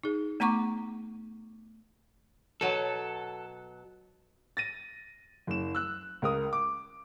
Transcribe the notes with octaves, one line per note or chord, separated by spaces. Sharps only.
D#4 G#4
A3 B3 F#5 A#5 C#6 D6
B2 F#3 A4
A6 A#6 D#7
F#1 E7
E6 F#6
C#2 A#4 D#6
D6